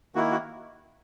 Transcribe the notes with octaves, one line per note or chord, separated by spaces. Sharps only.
D#3 A#3 E4 F#4
F#4